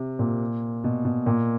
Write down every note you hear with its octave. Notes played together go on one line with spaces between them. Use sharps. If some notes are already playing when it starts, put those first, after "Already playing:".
Already playing: C3
A#2
B2
B2
A#2